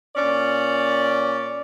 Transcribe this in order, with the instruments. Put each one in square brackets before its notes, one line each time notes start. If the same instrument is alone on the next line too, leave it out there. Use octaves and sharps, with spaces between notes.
[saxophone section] A#2 C#4 D5